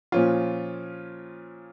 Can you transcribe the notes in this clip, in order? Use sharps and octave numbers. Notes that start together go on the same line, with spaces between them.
A#2 F3 C#4 F4